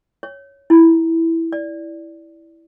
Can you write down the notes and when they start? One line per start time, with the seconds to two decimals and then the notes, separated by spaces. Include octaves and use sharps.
0.23 C#5
0.70 E4
1.52 D5